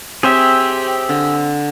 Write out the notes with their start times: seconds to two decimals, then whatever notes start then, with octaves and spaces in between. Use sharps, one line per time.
0.23 C4 G4 G#4 C5 C#5 E5 G5
1.09 D3